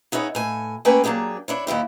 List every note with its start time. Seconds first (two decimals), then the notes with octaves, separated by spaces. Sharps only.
0.12 B3 D#4 E4 G#4 C#5
0.35 A2 G#5
0.85 A3 A#3 C#4 B4 G5 G#5
1.04 F#3 A#3 D4 G4 G#4
1.48 D4 E4 C#5
1.67 D#2 G3 E4 G4